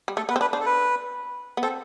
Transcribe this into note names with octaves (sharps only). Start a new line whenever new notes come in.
G3
A3 A4
B3 B4
C4
D4 B4
D4 C5
A4
B4
B3
C4 A4